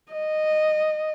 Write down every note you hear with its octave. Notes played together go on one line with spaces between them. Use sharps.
D#5